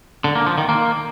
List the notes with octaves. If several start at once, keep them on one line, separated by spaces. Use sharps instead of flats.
D3
A#3
F3
D#3
A#3